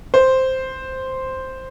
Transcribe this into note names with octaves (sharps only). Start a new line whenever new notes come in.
C5